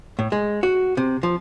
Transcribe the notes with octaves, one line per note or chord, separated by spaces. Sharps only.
A2
G#3
F#4
C3
F3